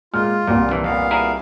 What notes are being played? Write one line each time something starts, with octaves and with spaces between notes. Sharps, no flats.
A#2 G#3 F4 F6
C2 G2 A#2
A#1 E3
F2 A#2 B3 F5
E4 G#4 A#4